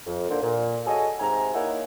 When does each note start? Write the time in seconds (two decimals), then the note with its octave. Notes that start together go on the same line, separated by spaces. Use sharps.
0.06 F2
0.30 D3 A#3 C5
0.43 A#2
0.86 F#4 G#4 A4 C#5 D#5 G#5
1.20 G#2 C3 G#5 A#5
1.54 A#3 D#4 E4 A#4 C#5 F#5